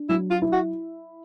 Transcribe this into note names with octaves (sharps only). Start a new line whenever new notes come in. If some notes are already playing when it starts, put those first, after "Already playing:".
Already playing: D4
F#3 E4
F4
E4
F#4